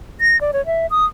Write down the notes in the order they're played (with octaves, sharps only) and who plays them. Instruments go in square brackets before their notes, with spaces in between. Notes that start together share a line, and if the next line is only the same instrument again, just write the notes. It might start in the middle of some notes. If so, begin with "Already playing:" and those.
[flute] A#6
D5
C#5
E5
D#6